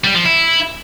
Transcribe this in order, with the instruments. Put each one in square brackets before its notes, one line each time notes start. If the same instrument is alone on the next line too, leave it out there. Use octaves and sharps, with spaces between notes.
[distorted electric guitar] G3
F3
E4